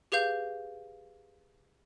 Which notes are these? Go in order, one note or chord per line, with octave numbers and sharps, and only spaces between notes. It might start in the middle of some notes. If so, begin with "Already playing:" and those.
G4 G#4 B4 F5 G6